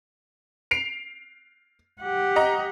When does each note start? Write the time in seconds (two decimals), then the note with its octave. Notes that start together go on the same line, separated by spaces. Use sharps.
0.71 C7 D7 F7
2.02 G4 F#5
2.36 D#5 A#5